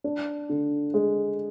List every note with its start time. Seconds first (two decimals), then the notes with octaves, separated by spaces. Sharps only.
0.04 D4
0.49 D3
0.94 G#3